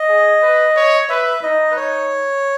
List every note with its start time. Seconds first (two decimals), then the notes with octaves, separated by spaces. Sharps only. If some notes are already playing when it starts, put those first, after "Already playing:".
Already playing: D#5
0.08 G#4
0.42 B4
0.76 C#5
1.09 B4 E5
1.43 D#4 D#5
1.71 B4
1.77 C#5